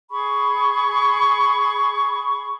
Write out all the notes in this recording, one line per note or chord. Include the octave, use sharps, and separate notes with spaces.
G#4 B5 C#6